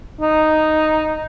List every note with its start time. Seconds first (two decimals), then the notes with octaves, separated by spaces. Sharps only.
0.21 D#4